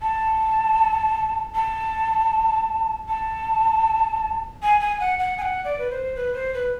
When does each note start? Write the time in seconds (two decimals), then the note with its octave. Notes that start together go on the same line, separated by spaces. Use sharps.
0.01 A5
1.54 A5
3.08 A5
4.62 G#5
4.80 G#5
5.00 F#5
5.19 F#5
5.38 G#5
5.42 F#5
5.64 D5
5.78 B4
5.90 C5
6.15 B4
6.34 C5
6.54 B4